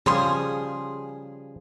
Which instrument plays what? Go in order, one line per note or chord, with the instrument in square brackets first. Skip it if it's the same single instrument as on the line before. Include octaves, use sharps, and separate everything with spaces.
[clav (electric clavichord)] C#3 F3 G3 [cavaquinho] G#4 C6 D#6